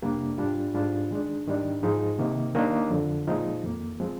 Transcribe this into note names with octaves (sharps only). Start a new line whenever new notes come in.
F2 C3 G3 A#3 D4
G#2 G3 D4 F4
G#2 G3 D4 F4
D#3 G#3 D4
G#2 D#3 G3 D4
G#2 F3 G#3 D#4
C3 D#3 A#3
D#3 G3 A#3 D4
F2 D3 F3
A#2 F3 G#3 D#4
F2 D#3 A#3
F3 G#3 C4